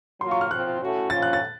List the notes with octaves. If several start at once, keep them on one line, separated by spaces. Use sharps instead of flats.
F#3 A#3 F4 C6
C#6
F6
F3 C4 F4 F#6
A2 A3 C#4 F#4
F3 A#3 C#4 F4 A6
F#6
A6